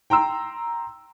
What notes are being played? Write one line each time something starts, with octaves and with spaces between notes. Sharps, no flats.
G5 A#5 C6 E6